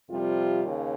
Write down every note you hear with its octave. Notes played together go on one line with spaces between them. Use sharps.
F2 C3 G3 F4
D#2 C#3